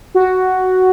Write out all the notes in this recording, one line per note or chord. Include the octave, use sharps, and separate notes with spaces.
F#4